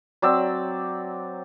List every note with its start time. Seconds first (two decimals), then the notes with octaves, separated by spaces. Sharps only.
0.22 F#3 C4 D5 E6